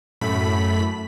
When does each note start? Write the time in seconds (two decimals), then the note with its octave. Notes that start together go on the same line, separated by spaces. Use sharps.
0.21 F#2 A2 A3 B5 B6